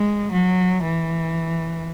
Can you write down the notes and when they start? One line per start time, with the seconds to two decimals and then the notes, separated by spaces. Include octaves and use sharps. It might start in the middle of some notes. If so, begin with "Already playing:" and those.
Already playing: G#3
0.32 F#3
0.84 E3